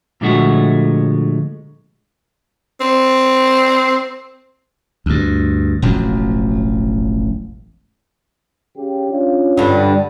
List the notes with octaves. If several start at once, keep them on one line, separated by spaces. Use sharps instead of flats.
A#2 D3 F3 G#3 A3 F#4
C4
D2 G2
E1 A1 F2 F#3
C#3 G4
C#4 D4 F4
G2 D3